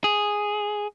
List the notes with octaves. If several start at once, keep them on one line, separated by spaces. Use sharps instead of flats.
G#4